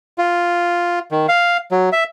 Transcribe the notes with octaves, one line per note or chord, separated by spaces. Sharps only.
F4
D#3
F5
F#3
E5